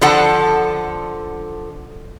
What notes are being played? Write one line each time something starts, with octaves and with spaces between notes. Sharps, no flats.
D3 F3 A4 F#5